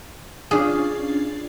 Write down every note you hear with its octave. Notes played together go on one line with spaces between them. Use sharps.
C#4 D4 F4 G#4